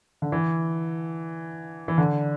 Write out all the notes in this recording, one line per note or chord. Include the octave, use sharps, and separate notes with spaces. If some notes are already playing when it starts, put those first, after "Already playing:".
D3
E3
E3
D3